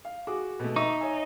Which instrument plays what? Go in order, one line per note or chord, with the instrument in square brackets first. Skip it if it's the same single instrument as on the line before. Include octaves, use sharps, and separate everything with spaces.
[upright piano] F5
F#4 G#4 D6
B2 A3
[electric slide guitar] D#4 [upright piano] E5 C#6
[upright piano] C#5 E5 G#5